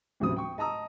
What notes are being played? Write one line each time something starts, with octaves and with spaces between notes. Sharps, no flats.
A1 D2 C3 F#3 C4 D#6
G5 C#6
D#5 A5 A#5 D#6 E6